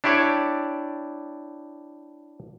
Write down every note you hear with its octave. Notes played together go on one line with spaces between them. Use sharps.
D4 E4 G4 C#5 D5